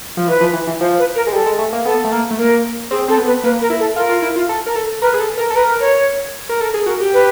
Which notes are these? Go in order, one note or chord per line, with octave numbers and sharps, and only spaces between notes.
F3
E3 B4
F3
E3
E3
F3 C5
B4
A#4
G#3
G3 A4
G#3
A3
A#3
B3 A4
A3
A#3
A3
A#3 A#4
C4 G#4
C4 A4
B3
B4
A#3 B4
A#4
E4
A4
F4 A#4
F4
E4
F4
A4
A#4
A4
A#4 B4
G#4
A4
A#4
A4
A#4 B4
C#5
A#4
A4 A#4
G#4
F#4 A#4
G4
B4